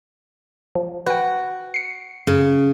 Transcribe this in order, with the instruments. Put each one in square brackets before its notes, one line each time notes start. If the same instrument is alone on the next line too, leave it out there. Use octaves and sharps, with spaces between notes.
[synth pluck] F3
[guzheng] F#4 [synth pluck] B4 G5
[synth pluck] C7 C#7
[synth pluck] F#2 [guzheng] C#3